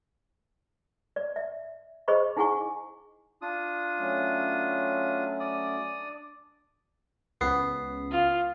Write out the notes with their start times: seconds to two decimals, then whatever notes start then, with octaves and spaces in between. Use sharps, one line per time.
1.16 D5
1.36 E5
2.08 G#4 C5 D#5 B5 C#6
2.37 D#4 E4 G#4 F#5 G#5 C#6
3.42 D4 F4 D#6
3.98 F#3 A3 C#4
5.40 D5 D#6
5.96 D4
7.41 C#2 B3 C7
8.12 F4